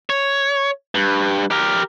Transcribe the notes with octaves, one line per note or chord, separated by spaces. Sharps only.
C#5
G2
G4 A#4